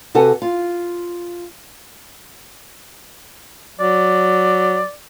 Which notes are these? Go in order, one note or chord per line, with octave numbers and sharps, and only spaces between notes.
C3 F#4 A4 B4 F#5 G#5
F4
F#3 D5